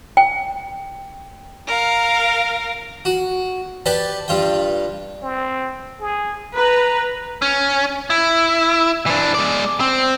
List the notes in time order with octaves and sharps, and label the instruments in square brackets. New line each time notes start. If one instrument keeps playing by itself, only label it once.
[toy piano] G5
[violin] A#4 F5
[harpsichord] F#4
G4 B4 D5 A5
G2 F4 G5
[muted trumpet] C4
G#4
[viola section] B4 [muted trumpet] A#5
[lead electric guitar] C#4
E4
E3 D4
G#3 D5
C4